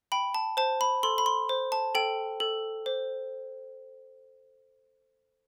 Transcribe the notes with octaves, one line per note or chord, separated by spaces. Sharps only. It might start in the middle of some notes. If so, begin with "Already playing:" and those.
G5 B5
A5
C5 A5
B5
A4 C6
B5
C6
C5
A5
A4 G5
A4
C5